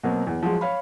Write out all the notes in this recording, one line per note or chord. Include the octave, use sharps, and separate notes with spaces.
B2 F#3 A#3 C4
E2
F3 F#3 G#3
C#5 F5 B5